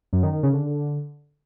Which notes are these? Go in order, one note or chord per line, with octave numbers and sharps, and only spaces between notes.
F#2
D#3
D#3
C#3
D3